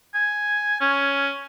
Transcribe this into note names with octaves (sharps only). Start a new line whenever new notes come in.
G#5
C#4